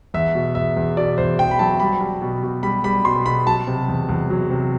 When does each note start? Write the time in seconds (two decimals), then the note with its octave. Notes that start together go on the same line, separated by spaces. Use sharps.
0.14 E2 E5
0.35 B2
0.55 E2 E5
0.77 E2
0.97 B2 D5
1.18 E2 C5
1.39 E2 G5
1.51 B5
1.59 F#3 A5
1.80 G3 B5
2.01 G3
2.22 B2
2.43 B2
2.63 G3 B5
2.84 G3 B5
3.05 B2 C6
3.26 B2 B5
3.47 F#3 A5
3.67 C3
3.88 E2
4.09 E2
4.30 F#3
4.51 C3